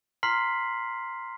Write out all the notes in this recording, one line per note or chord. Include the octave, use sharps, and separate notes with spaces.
A#5 C6 F6 B6 C7 F#7